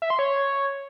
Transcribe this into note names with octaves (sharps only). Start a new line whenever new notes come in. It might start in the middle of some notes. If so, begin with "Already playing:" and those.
E5
C6
C#5